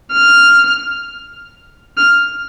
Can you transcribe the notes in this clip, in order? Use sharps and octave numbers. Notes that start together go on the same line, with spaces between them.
F6
F6